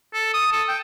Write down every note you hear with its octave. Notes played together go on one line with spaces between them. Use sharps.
A4
D#6
A4
G5